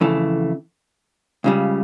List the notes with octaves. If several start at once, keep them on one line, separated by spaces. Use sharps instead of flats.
F2 C#3 E3 A3
C#2 C#3 G3